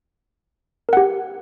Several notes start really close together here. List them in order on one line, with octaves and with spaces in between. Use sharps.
A#4 F#5 G4